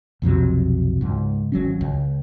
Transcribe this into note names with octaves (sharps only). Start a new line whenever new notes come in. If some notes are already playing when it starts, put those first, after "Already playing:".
B1 F2 C3 F#3
C#2 G#2
G#1 F#3 C#4
C#2